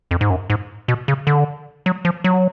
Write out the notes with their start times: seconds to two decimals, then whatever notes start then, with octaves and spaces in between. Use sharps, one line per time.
0.11 F2
0.21 G#2
0.30 F#2
0.50 G#2
0.88 B2
1.08 C#3
1.27 D3
1.86 F#3
2.05 F3
2.24 F#3